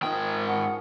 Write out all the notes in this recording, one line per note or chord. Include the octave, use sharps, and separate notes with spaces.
G#2 D#3 F3 D#5 G5
C#4 F#5